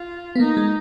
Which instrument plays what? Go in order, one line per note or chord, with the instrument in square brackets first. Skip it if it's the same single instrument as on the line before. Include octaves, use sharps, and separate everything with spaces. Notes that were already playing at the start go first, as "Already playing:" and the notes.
Already playing: [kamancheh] F4
[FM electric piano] B3
[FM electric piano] A#3 [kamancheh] D#4
[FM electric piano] G#3